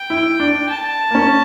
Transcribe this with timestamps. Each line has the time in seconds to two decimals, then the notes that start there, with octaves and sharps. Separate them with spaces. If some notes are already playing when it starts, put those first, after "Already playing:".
Already playing: G5
0.10 E4
0.40 D4
0.69 A5
1.11 A#3
1.15 C#4